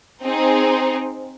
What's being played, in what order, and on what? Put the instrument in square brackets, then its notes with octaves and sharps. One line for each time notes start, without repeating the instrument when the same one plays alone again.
[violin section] C4 D#4 G#4